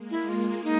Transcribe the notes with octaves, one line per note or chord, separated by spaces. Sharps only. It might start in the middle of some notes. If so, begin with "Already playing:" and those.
Already playing: G#3 A#3
E4
F4
D#4